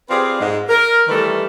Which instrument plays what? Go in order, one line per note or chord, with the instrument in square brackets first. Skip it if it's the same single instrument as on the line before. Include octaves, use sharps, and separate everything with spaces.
[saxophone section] C4 F4 G4 G#4 B4 D5
G#2 G#3
A#4
D#3 E3 G3 A3 B4